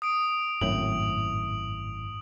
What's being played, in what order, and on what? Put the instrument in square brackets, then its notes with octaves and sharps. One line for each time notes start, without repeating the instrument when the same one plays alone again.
[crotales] D#6 D7
[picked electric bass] G#1 F#2 A2 [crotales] F#7